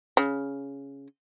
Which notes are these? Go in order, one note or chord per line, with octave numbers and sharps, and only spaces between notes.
C#3